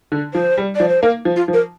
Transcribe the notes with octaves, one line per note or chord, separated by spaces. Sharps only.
D3
F3 C5
G3
F3 D5
C5
A#3 A#4
F3
F4
F3
A#4